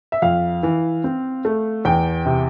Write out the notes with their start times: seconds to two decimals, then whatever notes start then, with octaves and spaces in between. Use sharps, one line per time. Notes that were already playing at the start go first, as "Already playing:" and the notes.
0.12 E5
0.22 F2 F5
0.63 E3
1.04 C4
1.45 A3
1.85 E2 G5
2.26 C3